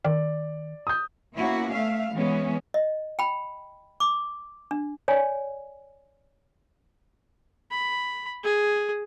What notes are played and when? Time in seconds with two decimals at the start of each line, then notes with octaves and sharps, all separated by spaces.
0.05 D#3 D5
0.87 D#6 G6
1.36 A#3 B3 C#4 E4 F#4
1.73 A3 E5 F5
2.14 E3 G#3 B3 C#4
2.74 D#5
3.19 G5 B5
4.00 D6
4.71 D4
5.08 C#5 D5 G#5
7.71 B5
8.44 G#4